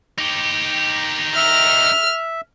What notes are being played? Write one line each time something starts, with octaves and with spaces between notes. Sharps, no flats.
D#4 G4
E5 F6